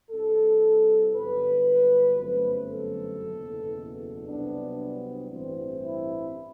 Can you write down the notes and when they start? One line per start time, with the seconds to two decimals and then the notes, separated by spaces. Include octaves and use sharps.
0.10 C2 C3 G3 A4
1.15 G1 G2 F#3 B4
2.19 G1 F#2 F#3 A3 C4
2.71 A4
3.22 F#1 E2 B2
4.26 C2 C3 F#3 B3 D4
5.31 A1 G2 E3 G3 C4
5.83 E4